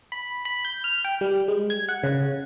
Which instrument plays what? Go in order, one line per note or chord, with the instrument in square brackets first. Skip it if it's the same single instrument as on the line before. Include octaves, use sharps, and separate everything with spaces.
[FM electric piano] B5
B5
G6
F6
G5
G3
G#3
G#6
F#5
C#3